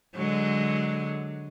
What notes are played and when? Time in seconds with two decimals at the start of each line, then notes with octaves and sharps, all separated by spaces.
0.16 D3 F#3 G#3